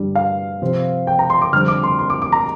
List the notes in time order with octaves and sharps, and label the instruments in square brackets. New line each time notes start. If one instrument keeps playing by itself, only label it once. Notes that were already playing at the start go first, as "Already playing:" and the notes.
Already playing: [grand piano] G2 D3 G3
F5
C3 F3 C4
G5
A#5
C6
D6
F2 D3 G3 C4 F6
D6
C6
C6
D6
D6
A#5